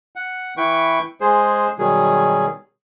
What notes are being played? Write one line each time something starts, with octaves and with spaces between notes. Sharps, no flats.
F#5
E3 E4 B4 G5 C#6
G#3 G#4 C5
B2 D#3 F#3 G3 G#4